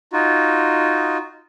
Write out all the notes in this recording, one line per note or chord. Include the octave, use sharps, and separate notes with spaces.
D#4 F4 F#4